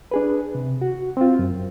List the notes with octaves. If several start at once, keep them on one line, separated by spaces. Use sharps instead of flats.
D4 G#4 B4
C3
F#4
C4 F4
F#2